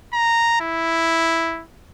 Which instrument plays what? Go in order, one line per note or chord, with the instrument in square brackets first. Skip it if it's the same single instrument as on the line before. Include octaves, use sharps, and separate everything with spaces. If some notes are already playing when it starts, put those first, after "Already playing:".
[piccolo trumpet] A#5
E4